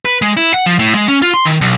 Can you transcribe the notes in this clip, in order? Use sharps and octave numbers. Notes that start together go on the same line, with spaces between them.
B4
G#3
E4
F#5
F3
A2
G#3
C#4
F4
C6
D#3
B1